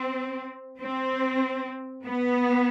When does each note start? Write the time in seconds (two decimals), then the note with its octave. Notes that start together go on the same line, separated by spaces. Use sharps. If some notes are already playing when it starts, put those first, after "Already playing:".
Already playing: C4
0.80 C4
2.05 B3